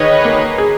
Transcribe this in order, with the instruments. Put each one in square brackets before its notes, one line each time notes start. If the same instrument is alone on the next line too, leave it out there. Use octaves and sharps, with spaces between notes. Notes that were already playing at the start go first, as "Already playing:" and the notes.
Already playing: [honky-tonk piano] D#3 [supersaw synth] G#4 B4 C#5 D#5
[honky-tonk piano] A#3 [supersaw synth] F#4
[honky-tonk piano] G#4